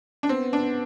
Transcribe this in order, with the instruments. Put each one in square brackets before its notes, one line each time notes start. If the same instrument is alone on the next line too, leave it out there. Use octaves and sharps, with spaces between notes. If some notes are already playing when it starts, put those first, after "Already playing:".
[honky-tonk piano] D4
[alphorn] B3 [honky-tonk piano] C4
[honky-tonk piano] D4